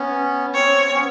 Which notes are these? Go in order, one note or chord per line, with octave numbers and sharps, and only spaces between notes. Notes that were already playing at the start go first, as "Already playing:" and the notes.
Already playing: B3 C#4
C4 C#5
B3 C#4